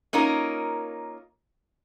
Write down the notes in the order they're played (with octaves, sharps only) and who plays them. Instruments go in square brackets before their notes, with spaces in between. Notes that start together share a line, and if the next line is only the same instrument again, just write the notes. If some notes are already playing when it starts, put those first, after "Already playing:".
[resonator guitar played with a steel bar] A#3 C#4 D#4 F4 A#4